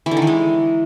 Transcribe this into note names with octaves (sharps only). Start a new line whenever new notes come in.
E3
D3
D#3
E3
G#3